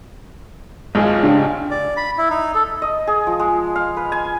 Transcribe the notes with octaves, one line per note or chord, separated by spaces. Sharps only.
G#1 F4 G#4 D#5
C#3 D4 F4 G4
D5
B5
E4
D#4
A4
D#5
G#4
F3
G#3
F5
B4
G#5